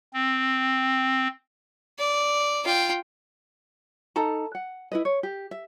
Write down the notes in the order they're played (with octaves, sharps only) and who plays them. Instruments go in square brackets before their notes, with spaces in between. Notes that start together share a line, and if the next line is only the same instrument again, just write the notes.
[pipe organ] C4
[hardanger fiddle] D5
F4 G5
[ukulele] D#4 A4 A5 A#5
F#5
E4 B4 D#5
C#5
G4
E5